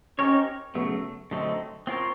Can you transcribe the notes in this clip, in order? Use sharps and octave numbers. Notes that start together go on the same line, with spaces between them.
C4 C#4 D#4 G4 A#4 C#5
C#3 F#3 A3 B3
D3 F#3 A3 C4 D#4
C4 F4 A#4 C#5